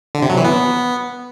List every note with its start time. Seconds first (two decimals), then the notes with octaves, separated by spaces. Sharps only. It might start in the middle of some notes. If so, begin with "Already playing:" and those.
0.15 D3
0.22 C3
0.30 F#3
0.37 E3
0.45 B3